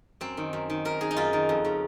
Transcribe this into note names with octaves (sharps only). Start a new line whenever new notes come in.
F#2 C4
D#3
F#2
D#3
F#2 A#4
D#3 G#4
D#4
F#2 F4
D#3
F2
C#3